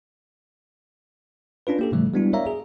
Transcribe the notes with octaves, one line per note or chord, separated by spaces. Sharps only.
C#4 D4 F4 B4
A#3 G4 A4
A2 C#3 E3 F3 G3 A3
G3 G#3 B3 D4 E4 F#4
A#4 C#5 D5 E5 F5 A#5
G#4